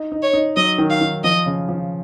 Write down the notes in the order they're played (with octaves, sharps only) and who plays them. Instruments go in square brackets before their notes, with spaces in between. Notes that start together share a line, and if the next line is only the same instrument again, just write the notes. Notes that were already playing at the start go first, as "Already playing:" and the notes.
Already playing: [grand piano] D#4
D#4
[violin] C#5
[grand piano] D#4
[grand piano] F#3 [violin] D#5
[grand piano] D#3
[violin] F5
[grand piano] D#3
[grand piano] F3 [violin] D#5
[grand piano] C#3
F3